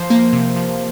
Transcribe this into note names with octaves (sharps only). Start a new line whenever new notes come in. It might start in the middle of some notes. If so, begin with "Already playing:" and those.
Already playing: F3 C5
A#3
C3
F3